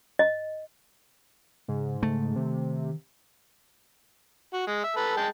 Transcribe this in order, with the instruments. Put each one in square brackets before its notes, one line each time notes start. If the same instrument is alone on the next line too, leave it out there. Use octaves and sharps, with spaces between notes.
[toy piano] D#5
[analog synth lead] G#2 [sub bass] C#3
[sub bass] C#3 [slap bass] A3
[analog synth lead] C3 [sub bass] D#3
[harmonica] F#4
G#3
E5
A4 B4
G#3 G5 A5